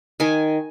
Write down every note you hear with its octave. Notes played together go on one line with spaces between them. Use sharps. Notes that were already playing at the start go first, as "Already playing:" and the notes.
D#3 G#5